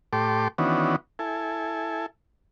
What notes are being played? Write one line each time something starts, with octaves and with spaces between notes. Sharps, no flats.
A2 G4 A4 C6 D6
D#3 E3 B3 C#4 D4 F#4
E4 A4 G#5